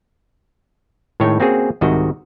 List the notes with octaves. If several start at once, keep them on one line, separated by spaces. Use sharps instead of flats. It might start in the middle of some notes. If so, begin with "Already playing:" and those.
A2 D#3 G#3 C#5 G5
A#3 C4 C#4 F#4 G#4
C2 G#2 C3 D#3 F#4 D#5